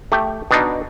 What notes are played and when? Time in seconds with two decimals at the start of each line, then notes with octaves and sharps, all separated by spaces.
0.12 A3 G4
0.51 B2 D4 D#4